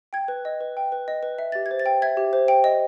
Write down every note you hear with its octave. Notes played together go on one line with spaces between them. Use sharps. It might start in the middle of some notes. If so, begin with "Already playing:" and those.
G5 G#6
B4
D#5
B4
G5
B4
D#5
B4
E5
G4 A6
G#6
C5
A6
G5
E5 G#6
G4
C5
G5
D#5